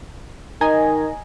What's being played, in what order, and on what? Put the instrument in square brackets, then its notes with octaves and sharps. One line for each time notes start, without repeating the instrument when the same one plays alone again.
[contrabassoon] D#3 [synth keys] D#5 G#5 A#5